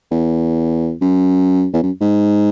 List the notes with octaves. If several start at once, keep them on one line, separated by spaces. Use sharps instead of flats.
E2
F#2
E2
F#2
G#2